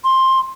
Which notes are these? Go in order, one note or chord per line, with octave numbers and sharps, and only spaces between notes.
C6